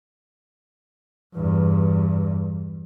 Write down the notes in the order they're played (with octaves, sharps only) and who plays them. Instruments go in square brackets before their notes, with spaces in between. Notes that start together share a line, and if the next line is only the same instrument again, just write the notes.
[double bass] E2 G2